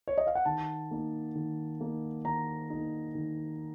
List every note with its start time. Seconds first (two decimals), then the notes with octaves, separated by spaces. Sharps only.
0.08 C#5
0.18 D#5
0.27 F5
0.35 F#5
0.45 D#3 A5
0.91 A#3 D#4
1.35 D#3
1.81 A#3 D#4
2.25 D#3 A#5
2.70 A#3 D#4
3.15 D#3